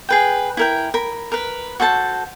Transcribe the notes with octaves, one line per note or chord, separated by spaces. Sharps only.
G#4 B4 G5
E4 A#4 G5
A#4 B5
A#4 B4
F#4 A4 C5 A5